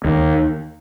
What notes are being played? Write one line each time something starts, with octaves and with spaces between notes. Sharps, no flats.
D#2